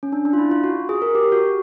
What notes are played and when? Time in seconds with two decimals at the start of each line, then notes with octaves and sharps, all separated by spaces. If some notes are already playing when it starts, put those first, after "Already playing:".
0.03 C#4
0.13 D4
0.25 D4
0.33 F4
0.38 E4
0.51 F4
0.64 F#4
0.89 G#4
1.02 A#4
1.15 G4
1.32 F#4